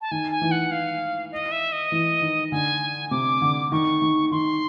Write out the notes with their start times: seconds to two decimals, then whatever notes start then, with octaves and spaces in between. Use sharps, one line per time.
0.01 A5
0.11 D#3 G#5
0.31 G#5
0.41 E3
0.51 F#5
0.71 F5
1.32 D#5
1.52 E5
1.72 D#5
1.92 E3
2.21 D#3
2.51 D3 G#5
3.11 C3 D6
3.42 D3
3.72 D#3 C#6
4.02 D#3
4.31 D#3 C6